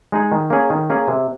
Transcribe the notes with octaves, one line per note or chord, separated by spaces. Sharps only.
G#3 D#4 G#4
D#3
A#3 C#4 G#4
D#3
A#3 C#4 G#4
C3